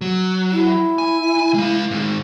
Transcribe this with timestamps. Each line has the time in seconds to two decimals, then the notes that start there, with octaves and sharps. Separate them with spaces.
0.01 F#3
0.52 E4
0.98 G#5
1.54 G#3 F5
1.91 G#2 D#3